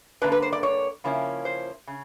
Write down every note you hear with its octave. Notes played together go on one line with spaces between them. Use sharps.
G2 D3 F3 A#3 D4 B4
B4
C5
D5
C#5
C#3 F3 A#3 C#4 E4
C5
C#3